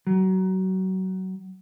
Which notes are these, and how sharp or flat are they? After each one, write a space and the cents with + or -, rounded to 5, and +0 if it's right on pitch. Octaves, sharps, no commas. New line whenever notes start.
F#3 +25